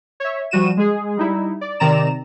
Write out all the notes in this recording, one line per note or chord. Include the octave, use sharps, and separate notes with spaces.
C#5 E5
F3 G3 F#4 D#7 E7
G#3 G#4
G3 D#4 E4
D5
C3 D#3 C4 D5 A#5 E7